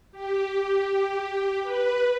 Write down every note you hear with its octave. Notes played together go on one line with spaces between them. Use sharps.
G4
B4